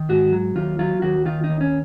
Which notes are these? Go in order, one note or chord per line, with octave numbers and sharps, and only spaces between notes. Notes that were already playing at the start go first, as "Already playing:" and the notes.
Already playing: D#3
G#2 F#4
F#3
D#2 F4
F#3 F4
D#2 F#4
D#3 F4
D#4
D#2
C#4